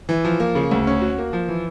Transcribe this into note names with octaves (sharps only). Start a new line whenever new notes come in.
E3
F3
A#3
C#3
D2
C#4
F#4
A#3
F3
E3